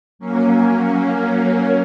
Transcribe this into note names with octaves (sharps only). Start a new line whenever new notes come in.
F#3 A#3 C#4